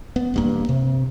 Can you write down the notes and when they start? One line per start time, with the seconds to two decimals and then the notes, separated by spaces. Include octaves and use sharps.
0.16 B3
0.34 E1 G2 A#3
0.69 C3